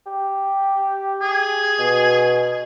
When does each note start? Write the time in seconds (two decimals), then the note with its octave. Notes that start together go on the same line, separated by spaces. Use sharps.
0.06 G4
1.22 G#4
1.79 B2